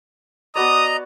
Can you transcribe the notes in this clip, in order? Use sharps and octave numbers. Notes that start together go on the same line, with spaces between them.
B3 F#4 D5 D#5 A#5 D#6